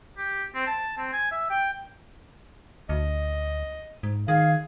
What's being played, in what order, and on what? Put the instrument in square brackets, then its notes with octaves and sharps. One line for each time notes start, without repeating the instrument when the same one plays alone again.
[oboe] G4
C4
A5
C4
G#5
E5
G5
[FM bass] D2 [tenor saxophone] D#5
[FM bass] G#2
[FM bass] D#3 [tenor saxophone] G#4 [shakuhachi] F5